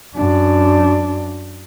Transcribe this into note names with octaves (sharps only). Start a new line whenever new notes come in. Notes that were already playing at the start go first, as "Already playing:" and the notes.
F#2 D4